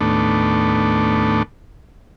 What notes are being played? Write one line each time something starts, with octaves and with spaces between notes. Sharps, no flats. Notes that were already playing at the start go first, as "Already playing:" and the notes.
D#2 A2 A3 B3 D4